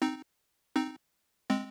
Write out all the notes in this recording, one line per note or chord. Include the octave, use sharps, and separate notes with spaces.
C4 D#4
C4 D#4
G#3 C4